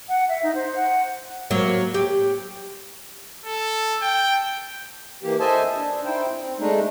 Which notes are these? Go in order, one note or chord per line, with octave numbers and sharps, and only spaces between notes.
F#5
E5
D#4
C5
F#5
F#3 A#3
G4
A4
G5
E3 A#3 G4
A4 C5 D#5 E5 G#5 A5
D4
D#4 E4 C5 G5
C4
G#3 A3 D4 D#4